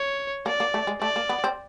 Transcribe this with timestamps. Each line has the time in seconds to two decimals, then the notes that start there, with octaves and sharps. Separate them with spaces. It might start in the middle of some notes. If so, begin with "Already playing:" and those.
Already playing: C#5
0.46 A#3 D5
0.60 A#3
0.74 A3
0.87 G#3
1.01 A3 D5
1.16 A#3
1.29 B3
1.44 C4